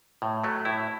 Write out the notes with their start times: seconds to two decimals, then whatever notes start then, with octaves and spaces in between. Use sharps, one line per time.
0.22 A2
0.44 F#3 A3
0.65 A2 E4